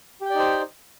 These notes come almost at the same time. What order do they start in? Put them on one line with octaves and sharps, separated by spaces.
G4 G5 D5 D#4 C5